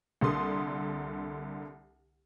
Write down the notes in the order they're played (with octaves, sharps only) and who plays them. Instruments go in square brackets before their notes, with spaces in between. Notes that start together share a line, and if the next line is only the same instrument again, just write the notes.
[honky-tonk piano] C2 D3 A#3 A4 C6 D#6